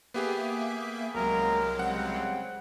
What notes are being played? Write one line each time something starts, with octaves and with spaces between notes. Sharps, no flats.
A#3 B3 G4 G#4 E5
C2 F#2 F#3 G#3 A#3 A#4
C#3 G3 C4 F#5